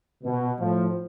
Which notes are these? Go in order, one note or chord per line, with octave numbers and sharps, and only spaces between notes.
B2
A2 F3